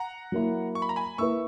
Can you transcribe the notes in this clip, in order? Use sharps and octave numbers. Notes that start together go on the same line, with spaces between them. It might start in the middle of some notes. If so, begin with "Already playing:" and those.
Already playing: F#5 A#5
F#3 A#3 E4
C#6
B5
A#5
G#5 B5
A#3 E4 B4 C#6 E6